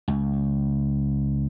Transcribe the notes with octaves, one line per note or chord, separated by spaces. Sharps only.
C#2